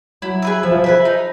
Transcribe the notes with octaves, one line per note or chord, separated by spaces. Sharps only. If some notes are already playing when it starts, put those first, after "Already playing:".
F#3 E4
G#4 B4 E5
F3 E4
G#4 B4 E5
D#4